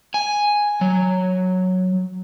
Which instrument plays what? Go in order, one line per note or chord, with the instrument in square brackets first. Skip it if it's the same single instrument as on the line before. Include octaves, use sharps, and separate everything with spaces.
[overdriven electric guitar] G#5
F#3